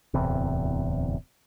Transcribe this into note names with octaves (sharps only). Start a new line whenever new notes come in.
D1 E2 C3